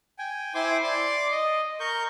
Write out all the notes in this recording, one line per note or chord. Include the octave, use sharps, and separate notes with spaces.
G5 G#5
E4 C5 G5 G#5 C6 D6
D5 C6 D6
D#5
A#4 C#6 G6